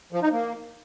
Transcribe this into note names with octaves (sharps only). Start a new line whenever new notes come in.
F3
D#4
A#3